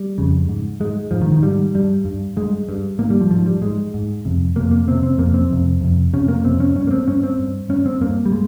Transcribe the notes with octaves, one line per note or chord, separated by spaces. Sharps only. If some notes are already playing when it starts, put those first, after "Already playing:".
Already playing: G3
F2 C#3
G#2
G#2 G#3
G#2 F3
D#3
D#3
G#2 G3
G2 G3
G2
G2 G#3
G2
G#2 A#3
G3
F3
G#2 F3
G3
G#2 G#3
G#2
F2 C3
F2 C3 A#3
A#3
F2 C3 C4
C4
F2 C3 A#3
C4
F2 C3
F2 C3
F2 C3 C#4
A#3
F2 C3 C4
C#4
G2 C#4
A#3
C4
G2 C#4
C4
G2
G2 C#4
C4
G2 A#3
G3
G#3